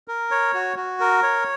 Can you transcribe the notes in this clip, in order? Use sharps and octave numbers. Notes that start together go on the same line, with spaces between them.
A#4
C#5
F#4
F#4
A#4
C#5